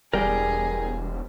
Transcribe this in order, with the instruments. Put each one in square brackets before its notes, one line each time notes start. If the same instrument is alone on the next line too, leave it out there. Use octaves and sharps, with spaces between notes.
[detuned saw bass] E1 [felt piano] G3 [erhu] G#4 [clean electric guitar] A#4 D5 G5